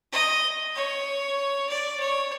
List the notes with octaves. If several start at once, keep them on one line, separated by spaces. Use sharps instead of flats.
D#5
C#5
D5
C#5